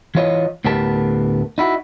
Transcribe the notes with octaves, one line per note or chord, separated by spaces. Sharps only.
E3 E4 F4 C#5 D#5
D2 A2 B3 G4 A#4 A5
D#4 E4 F#4